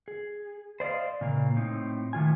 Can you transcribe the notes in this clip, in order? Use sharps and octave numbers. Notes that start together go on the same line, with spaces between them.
G#4
C5 D5 D#5 F5
A#2 C#3 A#3
A2 C4 D#4
A2 D#3 F4 G#5